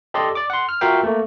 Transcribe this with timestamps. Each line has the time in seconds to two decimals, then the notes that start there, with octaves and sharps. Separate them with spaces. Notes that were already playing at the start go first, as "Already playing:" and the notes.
0.14 G4 A4 D5 D#5 C6
0.35 D5 D6
0.50 F#5 C6
0.69 F6
0.81 F4 F#4 A#4 E5 F5 G5
1.03 A3 A#3